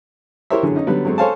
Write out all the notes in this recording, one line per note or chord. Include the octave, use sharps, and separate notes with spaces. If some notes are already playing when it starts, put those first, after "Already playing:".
E4 G4 A#4 C5 C#5 E5
D3 E3 F#3 G#4
C#4 D#4 D#5
D3 F#3 G3 B3
F#3 G#3 C4 A4 C#5
A4 C5 C#5 F5 G#5 A5